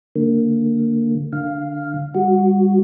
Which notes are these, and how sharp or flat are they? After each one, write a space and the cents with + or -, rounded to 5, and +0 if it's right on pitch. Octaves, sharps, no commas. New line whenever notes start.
D3 +0 A#3 -15
D3 +0 F5 +0
G3 +20 F#4 +0